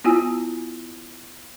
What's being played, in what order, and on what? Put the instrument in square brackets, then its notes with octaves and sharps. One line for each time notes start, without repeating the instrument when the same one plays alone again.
[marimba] B3 E4 F4 G#5 E6